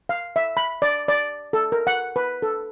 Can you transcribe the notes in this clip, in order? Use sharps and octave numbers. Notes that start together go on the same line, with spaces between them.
F5
E5
B5
D5
D5
A4
A#4
F#5
B4
A4